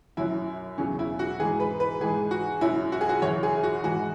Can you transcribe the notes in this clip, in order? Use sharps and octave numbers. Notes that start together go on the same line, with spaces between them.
F#2 F#3 E4
E2 C#3 F#3 C#4
E4
F#4
G#2 E3 G#4
B4
B4
G#2 E3 G#4
F#4
F#2 F#3 E4
F#4
G#4
F#4
F#2 C#3 E3 C#5
G#4
F#4
G#2 E3 F#4